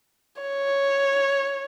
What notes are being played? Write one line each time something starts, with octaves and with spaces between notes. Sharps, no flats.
C#5